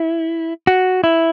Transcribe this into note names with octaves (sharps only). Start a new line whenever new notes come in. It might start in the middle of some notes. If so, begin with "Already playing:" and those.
Already playing: E4
F#4
E4